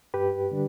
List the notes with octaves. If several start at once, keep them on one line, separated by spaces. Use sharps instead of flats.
G2 G4 B4
D3 G3 D4